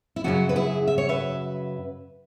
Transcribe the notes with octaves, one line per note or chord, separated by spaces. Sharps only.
E4
F#2 C#3 F#3 F#4
B4
E4 G#4
E5
C#5
B4 E5